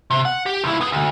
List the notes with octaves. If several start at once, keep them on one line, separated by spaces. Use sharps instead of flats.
C3
F#5
G4
C#2 E4
B3 G#4
D2